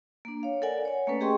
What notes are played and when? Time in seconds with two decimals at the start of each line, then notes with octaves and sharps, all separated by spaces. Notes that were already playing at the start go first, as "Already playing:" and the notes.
0.25 A#3 D4
0.43 C#5 F5
0.62 A4 A#4 D5 F#5 G#5
0.85 C#5 G#5
1.07 A3 A#3 C#4 A4 B4
1.21 G4 G#4 D#5 G5 C6 C#6